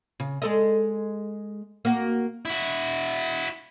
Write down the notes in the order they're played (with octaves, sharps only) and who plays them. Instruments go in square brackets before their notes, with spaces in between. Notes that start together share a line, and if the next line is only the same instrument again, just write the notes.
[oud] C#3
G#3 A4 D#5
A#3 F#4
[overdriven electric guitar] E4 F#4